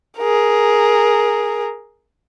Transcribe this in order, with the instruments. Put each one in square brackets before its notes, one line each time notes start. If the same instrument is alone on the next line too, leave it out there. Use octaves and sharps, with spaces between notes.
[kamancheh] G#4 A#4